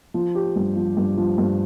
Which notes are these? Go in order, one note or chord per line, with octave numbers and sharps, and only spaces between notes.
F3
G4
G2
F3
G2
F3
G2